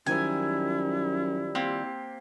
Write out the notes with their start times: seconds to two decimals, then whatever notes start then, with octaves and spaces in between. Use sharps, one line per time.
0.07 F#2 D#3 F3 G3 E4 G#5
1.55 A#3 C4 G4